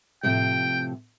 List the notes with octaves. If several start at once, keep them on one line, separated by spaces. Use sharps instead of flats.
A2 C3 F3 G5